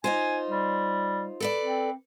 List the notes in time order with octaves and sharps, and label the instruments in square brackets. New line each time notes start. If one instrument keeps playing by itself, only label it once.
[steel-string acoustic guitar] D#4 F4 C5 [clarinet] G#5
[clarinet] G3
[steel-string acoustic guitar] A4 B4 D5
[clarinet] C4